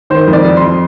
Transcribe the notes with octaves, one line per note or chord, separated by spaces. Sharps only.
D#3 C5
F2
D5
F2
C6
F2